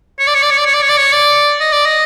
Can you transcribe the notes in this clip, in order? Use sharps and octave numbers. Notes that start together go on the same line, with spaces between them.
C#5
D5
C#5
D5
C#5
D5
C#5
D5
C#5
D5
C#5
D5
D#5
D5
D#5